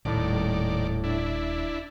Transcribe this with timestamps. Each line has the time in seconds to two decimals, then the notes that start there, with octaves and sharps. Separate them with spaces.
0.05 D#1 A2 D#3 D5
1.04 D4 E4